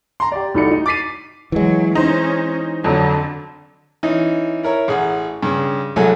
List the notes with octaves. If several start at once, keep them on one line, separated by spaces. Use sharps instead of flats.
A#5 C6
G4 D5
C2 A3 D#4 F#4 D5 C#7
D#4
D6 A6 B6 C7 D#7
E3 F#3 G#3
C#4 D#4 C5
F2 D3 F#3
E3 C#4 D#4
E4 A#4 C#5 A#5
A1 G#4 F#5
G2 C#3
C2 F#3 G#3 A3 A4 G#5